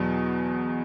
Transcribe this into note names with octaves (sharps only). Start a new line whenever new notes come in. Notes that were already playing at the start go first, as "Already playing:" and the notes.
Already playing: E2 B2 F#3